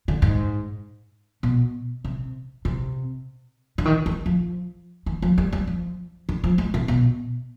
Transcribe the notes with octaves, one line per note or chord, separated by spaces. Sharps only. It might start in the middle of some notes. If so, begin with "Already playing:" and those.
D3
G#2
B2
C3
C3
D3
D#3
D#3
F3
D#3
F3
G3
G3
F3
D3
F3
G#3
C3
B2